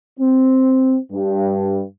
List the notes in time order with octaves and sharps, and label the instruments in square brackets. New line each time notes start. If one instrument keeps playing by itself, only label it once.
[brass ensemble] C4
G2